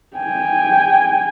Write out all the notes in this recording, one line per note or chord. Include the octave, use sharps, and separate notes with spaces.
G5 G#5